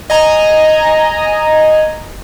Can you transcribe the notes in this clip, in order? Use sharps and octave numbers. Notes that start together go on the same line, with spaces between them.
D#5 G#5 A#5